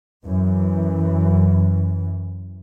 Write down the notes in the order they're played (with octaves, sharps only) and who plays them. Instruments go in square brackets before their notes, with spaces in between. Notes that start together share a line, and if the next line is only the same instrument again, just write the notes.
[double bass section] F#2 E3